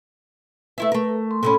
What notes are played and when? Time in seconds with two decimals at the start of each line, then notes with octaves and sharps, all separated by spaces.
0.78 A3 E4 B4 E5
0.92 A3 A#4
1.31 C6
1.43 A2 D3 C#4 A4 B5